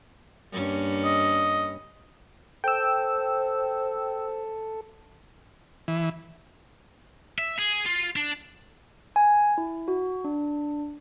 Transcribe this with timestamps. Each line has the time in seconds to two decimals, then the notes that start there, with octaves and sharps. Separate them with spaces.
0.53 G2 A#3 C#4
1.05 D#5
2.64 A4 C5 G5 E6
5.88 E3
7.38 E5
7.58 G#4
7.85 F4
8.16 D4
9.16 G#5
9.58 E4
9.88 F#4
10.24 D4